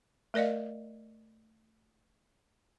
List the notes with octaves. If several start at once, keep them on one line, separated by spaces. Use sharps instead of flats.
A3 A#4 D5 D#5 F5